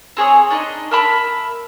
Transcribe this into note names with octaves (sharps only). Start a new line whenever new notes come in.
C4 G#4 C#5 D#6
D4 D#4 C#5 D#5
A#4 E5 A5 B5